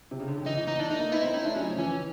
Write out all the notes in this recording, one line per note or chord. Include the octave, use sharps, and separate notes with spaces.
C3
C#3
D3
D#3
E3 D#4
E3
E3 D#4
E3 D4
A3 D#4
A#3
B3 E4
C4
C#4 D#4
A3 D4
F#3 C#4
F3
E3 C#4